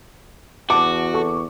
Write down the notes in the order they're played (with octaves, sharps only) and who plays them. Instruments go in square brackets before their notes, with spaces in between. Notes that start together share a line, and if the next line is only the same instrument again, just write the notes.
[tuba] E2 [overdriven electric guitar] F#4 [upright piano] A5 [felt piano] D6
[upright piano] A4 C#6